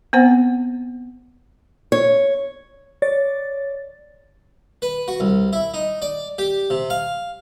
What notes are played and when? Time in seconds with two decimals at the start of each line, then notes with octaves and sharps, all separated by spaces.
0.13 B3 C4 C5 F#5
1.92 C#5
3.02 C#5 D5 A6
4.82 B4
5.08 F#4
5.20 C2
5.53 E4
5.74 D#4
6.02 D5
6.38 G4
6.70 C3
6.90 F5